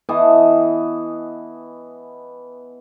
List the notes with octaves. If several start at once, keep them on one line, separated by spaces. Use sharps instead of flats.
E3 B3 D#5 A5